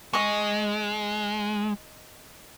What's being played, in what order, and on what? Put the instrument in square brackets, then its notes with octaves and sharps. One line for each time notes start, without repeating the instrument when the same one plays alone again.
[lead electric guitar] G#3 [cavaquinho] D#5 C#6